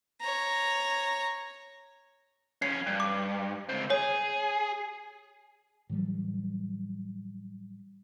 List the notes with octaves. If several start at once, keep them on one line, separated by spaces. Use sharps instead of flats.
C#5 A#5
F2 C#4 C7
G2
D6
C#2 C4
G#4 C#5
A2 E3 F#3 G3